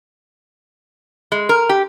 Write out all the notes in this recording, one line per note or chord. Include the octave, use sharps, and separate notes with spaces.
G#3
A#4
G4